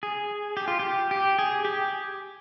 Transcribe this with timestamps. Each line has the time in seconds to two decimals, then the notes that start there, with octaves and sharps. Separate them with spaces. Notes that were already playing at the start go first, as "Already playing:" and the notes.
0.03 G#4
0.57 G4
0.68 F4
0.79 G4
1.11 G4
1.39 G#4
1.65 G4